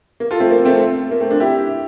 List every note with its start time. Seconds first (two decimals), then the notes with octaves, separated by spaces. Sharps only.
0.20 A#3
0.31 F4 A4
0.40 A3 C4
0.51 A#3
0.65 A3 C4
0.81 A3
1.11 A#3
1.20 A3 C4
1.31 A#3 D4
1.40 E4 G4